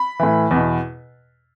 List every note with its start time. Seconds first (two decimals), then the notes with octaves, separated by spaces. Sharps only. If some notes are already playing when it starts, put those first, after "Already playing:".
Already playing: B5
0.19 A2 E3
0.51 E2 B2